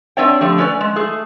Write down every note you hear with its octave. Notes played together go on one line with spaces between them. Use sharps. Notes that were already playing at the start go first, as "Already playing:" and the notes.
C4 D4 C#5 D5 E5 G5
D3 F3 A3 G4
A3 C#4 B4 C#5 D5
G#3
A3 G#4